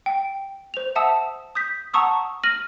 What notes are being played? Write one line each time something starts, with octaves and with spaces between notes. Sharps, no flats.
G5
C5 F7
E5 F#5 A5 D#6 E6
D#6 G6 B6
F#5 A5 A#5 C#6 D#6 E6
F6 A#6 D#7 F#7